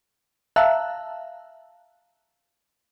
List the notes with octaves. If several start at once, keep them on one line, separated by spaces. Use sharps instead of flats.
E5 F5 A5 A#5 E6 F#6